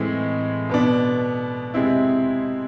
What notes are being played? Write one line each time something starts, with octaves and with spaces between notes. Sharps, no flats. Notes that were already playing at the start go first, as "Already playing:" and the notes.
Already playing: A2 E3 G#3 C4
B2 B3 D4
C3 G#3 C4 E4